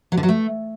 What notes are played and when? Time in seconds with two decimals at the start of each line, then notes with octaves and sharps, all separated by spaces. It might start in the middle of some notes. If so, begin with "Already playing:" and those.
0.12 F#3
0.17 D3
0.23 F#3
0.29 A3